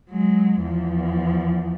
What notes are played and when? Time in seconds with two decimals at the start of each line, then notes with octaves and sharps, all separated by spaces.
0.10 F#3 G#3
0.62 E2 F3